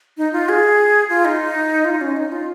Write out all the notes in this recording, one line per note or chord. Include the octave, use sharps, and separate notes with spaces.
D#4
F4
G#4
F4
D#4
F4
D#4
C#4
D#4
F4